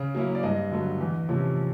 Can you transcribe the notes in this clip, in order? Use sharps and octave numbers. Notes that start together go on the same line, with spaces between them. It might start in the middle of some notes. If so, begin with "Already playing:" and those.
Already playing: C#3
F#3 A#3 C#4 E4
D5
G2 D#5
D3 F#3 A3
E2
C3 F3 A3 C#4